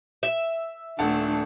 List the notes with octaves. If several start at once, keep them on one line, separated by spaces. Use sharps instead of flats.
E5
D#1 A3 D4 F#5 A5